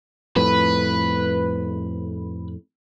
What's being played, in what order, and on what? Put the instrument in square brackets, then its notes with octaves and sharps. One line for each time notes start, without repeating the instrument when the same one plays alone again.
[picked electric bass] F2 A2 [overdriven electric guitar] B4